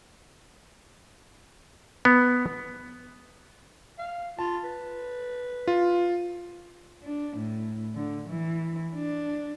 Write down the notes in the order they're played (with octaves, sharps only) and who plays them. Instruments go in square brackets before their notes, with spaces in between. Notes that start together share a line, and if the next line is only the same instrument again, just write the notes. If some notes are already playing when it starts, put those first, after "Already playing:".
[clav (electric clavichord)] B3
[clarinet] F5
[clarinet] F4 [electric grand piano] A5
[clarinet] B4
[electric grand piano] F4
[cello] D4
A2
D3
E3
D4